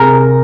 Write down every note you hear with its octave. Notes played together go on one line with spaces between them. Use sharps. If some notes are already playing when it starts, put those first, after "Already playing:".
Already playing: C3 G#4 A#4